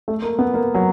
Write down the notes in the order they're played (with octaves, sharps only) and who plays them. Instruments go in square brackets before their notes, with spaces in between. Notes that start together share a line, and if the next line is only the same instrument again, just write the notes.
[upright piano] A3
A#3
B3
A#3
F#3